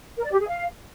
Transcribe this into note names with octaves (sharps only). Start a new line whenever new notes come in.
A#4
D5
G4
G#4
F5